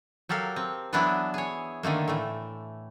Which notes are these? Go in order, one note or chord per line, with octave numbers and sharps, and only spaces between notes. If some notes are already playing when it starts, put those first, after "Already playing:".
F#3 G4 A4 A#4 F5
C4
E3 F#3 A3 B3 D4 E4
G#4 C#5
D3 D#3 A3 A#3
A2 E3 A3